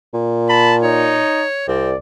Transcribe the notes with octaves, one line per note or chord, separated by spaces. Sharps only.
A#2
A5 B5
D#4 C#5
C2 C4 D5